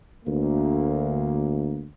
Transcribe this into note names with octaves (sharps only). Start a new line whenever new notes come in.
D2 A#3